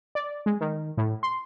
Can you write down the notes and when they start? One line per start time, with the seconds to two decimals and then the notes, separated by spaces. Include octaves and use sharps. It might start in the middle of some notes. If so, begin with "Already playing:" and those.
0.15 D5
0.46 G#3
0.61 D#3
0.97 A2
1.23 C6